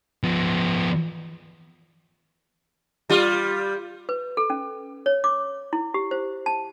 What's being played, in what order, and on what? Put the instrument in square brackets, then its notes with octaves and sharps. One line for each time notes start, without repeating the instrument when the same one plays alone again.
[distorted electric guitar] F3 B3
[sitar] G3 F4
[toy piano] B4
A4
C#4
C#5
D6
E4
G4
C5
A5